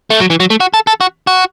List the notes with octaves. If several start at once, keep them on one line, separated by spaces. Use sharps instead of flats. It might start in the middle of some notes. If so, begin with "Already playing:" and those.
A3
F#3
E3
F#3
A3
F#4
A4
A4
F#4
F#4